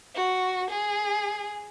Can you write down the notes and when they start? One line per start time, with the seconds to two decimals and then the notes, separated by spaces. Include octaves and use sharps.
0.15 F#4
0.70 G#4